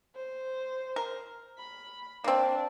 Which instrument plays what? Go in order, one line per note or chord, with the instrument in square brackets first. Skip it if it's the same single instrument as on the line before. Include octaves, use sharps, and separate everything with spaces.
[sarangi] C5
[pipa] A#4
[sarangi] B5
[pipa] A#3 C4 [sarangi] D4